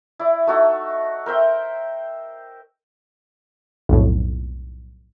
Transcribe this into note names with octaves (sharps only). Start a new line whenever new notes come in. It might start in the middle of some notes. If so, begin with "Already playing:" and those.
E4 D5
A3 D#4 F#4 A4
A#4 C5 E5 G5
B1 F2 A2